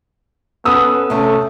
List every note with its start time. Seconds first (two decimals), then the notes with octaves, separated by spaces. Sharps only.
0.65 B3 C#4 A4 B4 D#6 E6
1.10 C3 A3 C#4